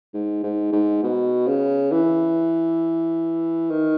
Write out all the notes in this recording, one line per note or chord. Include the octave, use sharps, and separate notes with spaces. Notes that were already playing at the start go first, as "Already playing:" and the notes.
G#2
G#2
G#2
B2
C#3
E3
D#3